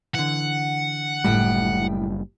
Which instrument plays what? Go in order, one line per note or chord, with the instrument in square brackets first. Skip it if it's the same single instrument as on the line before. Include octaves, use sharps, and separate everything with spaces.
[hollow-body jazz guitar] D3 E3 [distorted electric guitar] F#5
[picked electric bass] F#1 G3 [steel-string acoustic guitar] A2 G5